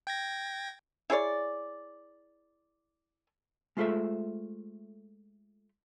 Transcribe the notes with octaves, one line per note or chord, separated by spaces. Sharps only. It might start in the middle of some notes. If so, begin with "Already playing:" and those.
G5 G#6 A#6
E4 G#4 C#5 D5
G#3 A3 F4 A4 C5 E5